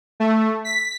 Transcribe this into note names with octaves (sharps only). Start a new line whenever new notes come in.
A3
B6